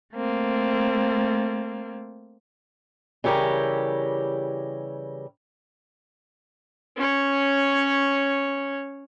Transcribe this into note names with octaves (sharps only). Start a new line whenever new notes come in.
A3 A#3 C4
C#3 E3 G3 G4 A#4 C#5
C#4 C#5